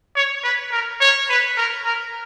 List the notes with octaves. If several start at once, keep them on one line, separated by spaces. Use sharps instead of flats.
C#5
B4
A#4
C#5
B4
A#4
A#4